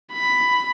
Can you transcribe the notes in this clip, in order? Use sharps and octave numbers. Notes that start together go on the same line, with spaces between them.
B5